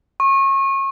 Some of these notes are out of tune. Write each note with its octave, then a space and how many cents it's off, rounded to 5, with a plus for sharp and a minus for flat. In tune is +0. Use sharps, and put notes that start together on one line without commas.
C#6 -30